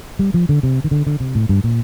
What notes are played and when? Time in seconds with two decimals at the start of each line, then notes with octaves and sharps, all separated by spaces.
0.19 G3
0.34 F3
0.49 D3
0.63 C3
0.84 D#3
0.91 D3
1.07 D3
1.20 C3
1.35 A2
1.49 G2
1.64 A#2